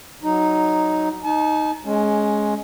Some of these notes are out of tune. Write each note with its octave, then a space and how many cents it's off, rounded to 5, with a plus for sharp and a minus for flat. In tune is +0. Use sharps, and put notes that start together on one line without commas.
F#3 +0 D#4 +0
D#4 +0 A5 -45
G#3 +15 C#4 +0